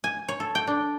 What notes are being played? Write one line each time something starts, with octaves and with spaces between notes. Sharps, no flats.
G#5
C#5
A4
G5
D4